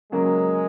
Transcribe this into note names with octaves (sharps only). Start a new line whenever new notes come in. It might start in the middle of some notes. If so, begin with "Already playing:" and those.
C#3 F#3 G#3 A#3